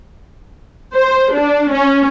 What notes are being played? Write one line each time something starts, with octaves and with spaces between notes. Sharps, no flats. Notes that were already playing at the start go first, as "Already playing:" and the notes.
C5
D4
C#4